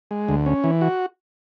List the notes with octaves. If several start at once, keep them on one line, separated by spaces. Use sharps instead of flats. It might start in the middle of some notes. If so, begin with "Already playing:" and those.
G#3
D2
C#4
E3
F#4